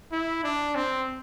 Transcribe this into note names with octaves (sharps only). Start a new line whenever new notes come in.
E4
D4
C4